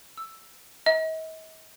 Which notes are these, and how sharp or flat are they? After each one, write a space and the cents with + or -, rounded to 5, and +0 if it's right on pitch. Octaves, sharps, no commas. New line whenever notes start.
E6 +5
D#5 +45